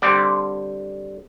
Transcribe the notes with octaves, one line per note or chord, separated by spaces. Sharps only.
D3 G3 C4 D5